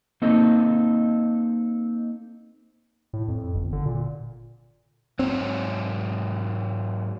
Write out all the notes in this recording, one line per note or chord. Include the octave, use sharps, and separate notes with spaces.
A#3 C4 D#4 A4 D#5
A2
F2
G1
D3
A#2
G#2 F#3 C4 C#5